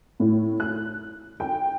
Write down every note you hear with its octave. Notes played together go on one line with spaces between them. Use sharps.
A2
F#6
G5